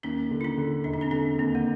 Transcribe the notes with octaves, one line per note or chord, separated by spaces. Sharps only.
D#2 C#4 D#4
D3
E4
C#4 D#4
D3
E1 D4
D#4
C4 D4
D3 C4 D4
D#2 C4
A#3